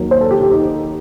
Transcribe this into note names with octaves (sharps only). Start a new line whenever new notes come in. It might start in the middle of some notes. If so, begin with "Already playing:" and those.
Already playing: D#2 D#3 F#3
C5
A4
G4
G4
D#4